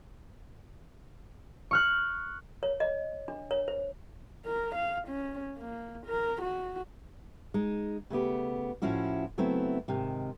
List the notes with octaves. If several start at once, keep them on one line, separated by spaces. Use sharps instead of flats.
C#6 F6 F#6
C#5
D#5
D4
C#5
C5
A#4
F5
C#4
A#3
A#4
F#4
G#3 D#4
C#3 A3 B3 G4
A2 F3 C#4 E4 F#4
C#3 F#3 A3 B3 C4 E4
G#2 C3 D#3